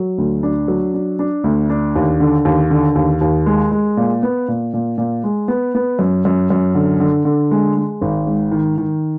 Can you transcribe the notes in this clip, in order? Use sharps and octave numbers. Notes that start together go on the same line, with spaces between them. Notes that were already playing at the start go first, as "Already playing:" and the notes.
Already playing: F#3
D2
D4
F#3
D4
D4
D2
D4
D#2
D3
D#2
D3
D#2
D#2
G#3
G#3
A#2
B3
A#2
A#2
A#2
G#3
B3
B3
F#2
F#2
F#2
D3
D3
D3
G#3
G#3
G#1
G#2
D#3
D#3